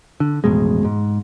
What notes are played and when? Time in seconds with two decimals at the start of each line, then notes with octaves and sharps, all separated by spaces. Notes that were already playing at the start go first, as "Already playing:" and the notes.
0.20 D3
0.44 A1 F2 B2 G#3
0.85 G#2